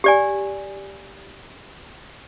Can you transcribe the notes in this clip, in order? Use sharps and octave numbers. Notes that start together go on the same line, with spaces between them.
G4 D5 G#5